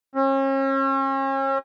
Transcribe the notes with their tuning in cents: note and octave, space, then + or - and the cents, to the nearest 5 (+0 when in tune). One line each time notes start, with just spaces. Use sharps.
C#4 -40